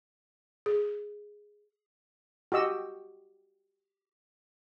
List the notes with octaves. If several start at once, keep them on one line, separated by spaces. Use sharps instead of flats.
G#4
F#4 G4 D#5 E6